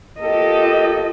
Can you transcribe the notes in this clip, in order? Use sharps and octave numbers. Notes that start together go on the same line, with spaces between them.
A#3 F4 G4 A4 D#5